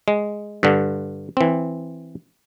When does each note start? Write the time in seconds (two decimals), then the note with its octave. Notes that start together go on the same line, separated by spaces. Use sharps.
0.08 G#3
0.63 G2 D3
1.37 E3 C4